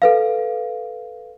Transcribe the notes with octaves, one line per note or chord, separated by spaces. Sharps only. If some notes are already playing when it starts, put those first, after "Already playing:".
A4 B4 F5